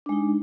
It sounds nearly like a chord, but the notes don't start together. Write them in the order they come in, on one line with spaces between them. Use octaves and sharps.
D4 G#3 D#4